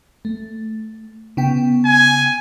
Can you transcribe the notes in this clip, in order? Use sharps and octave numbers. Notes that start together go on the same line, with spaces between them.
A3
C#3 B3 G5
G#5